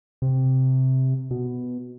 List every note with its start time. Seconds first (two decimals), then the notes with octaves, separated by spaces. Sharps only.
0.22 C3
1.31 B2